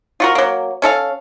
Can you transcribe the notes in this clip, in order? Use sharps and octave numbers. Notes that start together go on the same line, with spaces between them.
F4 F#4 A#4
F#3 A#3
C#4 A4 E5 F5